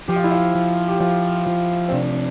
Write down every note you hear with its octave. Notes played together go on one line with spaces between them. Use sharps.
F3 G4
F4
E4
F4
F3
G4
F3 F4
F3
C4
C3 D4